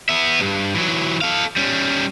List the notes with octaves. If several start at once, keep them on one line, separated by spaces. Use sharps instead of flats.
B3 E5
C#2 G2
E3 F#3
A4 F5
G3 C#4